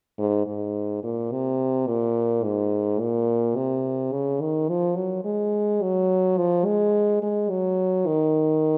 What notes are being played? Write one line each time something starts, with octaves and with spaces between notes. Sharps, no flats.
G#2
G#2
A#2
C3
A#2
G#2
A#2
C3
C#3
D#3
F3
F#3
G#3
F#3
F3
G#3
G#3
F#3
D#3